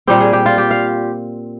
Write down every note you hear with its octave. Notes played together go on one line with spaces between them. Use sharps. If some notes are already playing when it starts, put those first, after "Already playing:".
A#2 G3 C4 G4
G#4
G4
F4
G4
F5